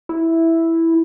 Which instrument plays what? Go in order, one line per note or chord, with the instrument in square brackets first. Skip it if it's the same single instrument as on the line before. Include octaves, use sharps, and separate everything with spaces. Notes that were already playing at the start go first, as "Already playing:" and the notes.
[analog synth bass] E4